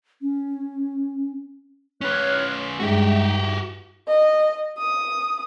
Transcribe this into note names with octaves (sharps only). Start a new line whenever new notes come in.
C#4
C#4 B4 C#5 F6 F#6
G2 G#3 D#4 F#4 G4 E5
D#5
D#6